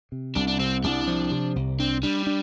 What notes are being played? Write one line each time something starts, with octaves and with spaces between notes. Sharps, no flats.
C3
C2 D4
D4
C3 C4
C2 D4
F3
C3
C2
C4 D4
G3 D4
D4